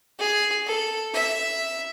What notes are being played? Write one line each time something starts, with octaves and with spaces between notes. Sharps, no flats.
G#4
A4
E5